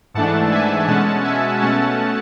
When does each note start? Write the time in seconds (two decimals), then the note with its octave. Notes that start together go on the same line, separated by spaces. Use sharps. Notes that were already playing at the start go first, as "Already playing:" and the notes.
0.14 G#2 E3 A3 D4 F#5 A5
0.52 E5 G#5
0.88 B2 G#3 C#4 F#5 A5
1.24 E5 G#5
1.61 B2 A3 C#4 F#5 A5